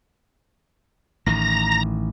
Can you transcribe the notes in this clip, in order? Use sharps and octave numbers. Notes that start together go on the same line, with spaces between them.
A1 A2 D#3 A#5 A#6